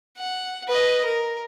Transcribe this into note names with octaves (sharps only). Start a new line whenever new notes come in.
F#5
B4 D#5
A#4